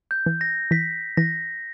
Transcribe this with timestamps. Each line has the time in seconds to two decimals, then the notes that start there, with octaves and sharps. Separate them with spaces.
0.11 G6
0.26 E3
0.41 A#6
0.71 E3 B6
1.17 E3 A#6